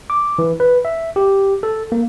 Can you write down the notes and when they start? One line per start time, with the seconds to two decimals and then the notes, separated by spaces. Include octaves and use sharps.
0.10 D6
0.39 E3
0.60 B4
0.85 E5
1.16 G4
1.63 A4
1.92 A#3